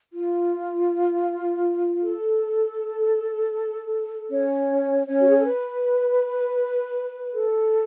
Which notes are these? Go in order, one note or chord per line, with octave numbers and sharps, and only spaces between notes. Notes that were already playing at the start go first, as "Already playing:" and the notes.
F4
A4
C#4 C#5
C#4 C#5
F#4
G#4
A4
B4
A4